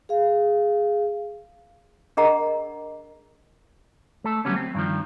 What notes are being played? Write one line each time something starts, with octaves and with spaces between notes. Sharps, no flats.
G#4 F5
D4 G#4 A#4 D#5 F#5 A#5
A3 A4
D2 G2 F#3 G3 B3 C#4
C4
G2 D#3 F3